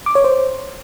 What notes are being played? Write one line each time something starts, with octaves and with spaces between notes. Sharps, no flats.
D6
C#5
C5